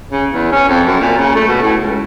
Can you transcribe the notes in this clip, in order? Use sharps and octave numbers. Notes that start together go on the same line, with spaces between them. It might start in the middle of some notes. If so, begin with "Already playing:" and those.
C#3
E2
C#4
F2
F#2
A#2
C#3
A3
B2
A2
C#2